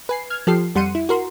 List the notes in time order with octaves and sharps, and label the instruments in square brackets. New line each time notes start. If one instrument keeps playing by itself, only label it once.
[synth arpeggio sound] B4 G#5 C7
F6 G#6
F3 G4 A4 F6 C7
F2 G3 F#5 C6 C#7 D#7
E4
F#4 A#4 C6